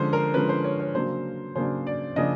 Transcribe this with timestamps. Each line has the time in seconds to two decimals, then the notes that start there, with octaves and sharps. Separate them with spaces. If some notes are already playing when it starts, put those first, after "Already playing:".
Already playing: D3 F3 G#3 C#4 C5
0.13 A#4
0.34 D3 F3 G#3 C#4 B4
0.49 C5
0.64 C#5
0.80 C#5
0.94 C#3 F#3 A#3 D4 C5
1.56 C#3 F#3 A#3 D4 C5
1.87 D5
2.16 C#3 F3 A#3 D4 D#5